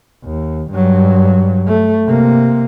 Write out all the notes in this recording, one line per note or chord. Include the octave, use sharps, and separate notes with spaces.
D#2
G2 F#3
A3
C3 A#3